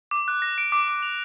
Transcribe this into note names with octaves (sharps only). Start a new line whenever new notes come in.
D6
F#6
A#6
D7
D6
D6
F7